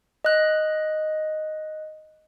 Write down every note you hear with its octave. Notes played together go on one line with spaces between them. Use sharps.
D#5 F#6